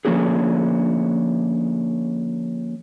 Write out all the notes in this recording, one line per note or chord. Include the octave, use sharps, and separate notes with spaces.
D3 F3 A#3 C#4 F#4 G#4